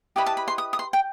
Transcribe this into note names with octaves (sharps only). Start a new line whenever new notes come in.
E4 G4 B4 D#5 B5
A5
B5
C6
D#6
D#6
C6
G5